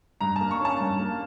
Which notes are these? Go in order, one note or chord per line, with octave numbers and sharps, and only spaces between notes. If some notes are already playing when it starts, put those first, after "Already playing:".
G2 A#5
A#3 A5
C#6
C#4 A5
G2
A#3